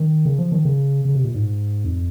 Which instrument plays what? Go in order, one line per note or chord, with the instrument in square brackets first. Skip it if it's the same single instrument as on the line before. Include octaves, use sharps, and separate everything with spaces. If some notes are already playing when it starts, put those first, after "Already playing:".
Already playing: [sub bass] D#3
C#3
F3
D#3
C#3
C#3
C3
A#2
G#2
F2